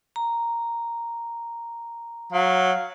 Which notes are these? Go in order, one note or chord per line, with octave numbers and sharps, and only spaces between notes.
A#5
F#3 F5